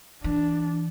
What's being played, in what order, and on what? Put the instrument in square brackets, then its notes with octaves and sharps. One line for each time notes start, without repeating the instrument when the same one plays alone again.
[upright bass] E3 [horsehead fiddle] D4